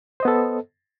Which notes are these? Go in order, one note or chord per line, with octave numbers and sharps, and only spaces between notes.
B3 A4 C5 D#5